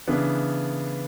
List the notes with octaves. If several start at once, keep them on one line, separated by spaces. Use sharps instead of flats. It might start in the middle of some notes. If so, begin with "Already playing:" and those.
C#3 E3 B3 D4